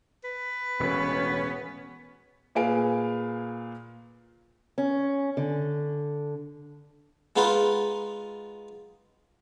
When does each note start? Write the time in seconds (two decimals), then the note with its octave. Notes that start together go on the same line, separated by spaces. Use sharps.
0.24 B4
0.80 E1 A2 B3 C#4
2.55 A#2 G#4 B4 F5 G#5 D7
4.78 C#4
5.37 D3
7.36 G#3 B3 D#4 F4 B4